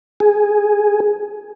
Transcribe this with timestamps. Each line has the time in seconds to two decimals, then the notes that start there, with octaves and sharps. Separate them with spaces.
0.20 G#4